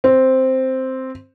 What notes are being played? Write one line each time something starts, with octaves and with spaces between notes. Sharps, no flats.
C4